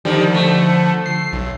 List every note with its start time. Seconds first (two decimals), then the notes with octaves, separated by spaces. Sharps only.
0.05 D3 D#3 F3 G3
0.34 A3
1.06 C7
1.33 B1